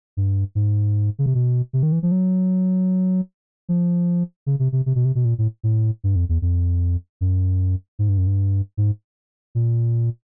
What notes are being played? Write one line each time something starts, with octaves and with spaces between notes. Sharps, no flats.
G2
G#2
C#3
C3
B2
C3
D#3
E3
F3
F#3
F3
C#3
C3
C3
C3
B2
C3
B2
A#2
A2
A2
G2
F2
E2
F2
F#2
G#2
G2
F#2
G2
G#2
A#2